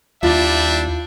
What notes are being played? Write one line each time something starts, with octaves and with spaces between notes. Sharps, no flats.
D#2 G3 D4 E4 F4 E5